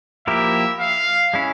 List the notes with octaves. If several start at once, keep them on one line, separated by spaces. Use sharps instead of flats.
F3 A#3 E4 G4 A#4 E5
F5
G#3 C#4 E4